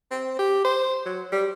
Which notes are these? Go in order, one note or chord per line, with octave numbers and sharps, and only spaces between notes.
C4
G4
C5
F#3
G3